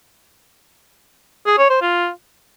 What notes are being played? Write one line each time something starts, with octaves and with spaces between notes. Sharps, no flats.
G#4
C#5
C5
F4